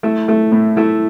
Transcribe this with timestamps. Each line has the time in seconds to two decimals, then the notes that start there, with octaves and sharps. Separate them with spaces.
0.03 A3 E4 E5
0.28 A3
0.52 A2
0.76 A3 E4 E5